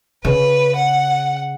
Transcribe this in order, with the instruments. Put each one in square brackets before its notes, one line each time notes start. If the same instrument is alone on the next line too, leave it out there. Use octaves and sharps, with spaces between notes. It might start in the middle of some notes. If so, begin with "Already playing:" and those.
[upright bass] C#3 [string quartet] B4
[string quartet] F#5